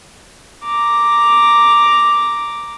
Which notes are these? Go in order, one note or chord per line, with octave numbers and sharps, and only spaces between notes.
A#5 D6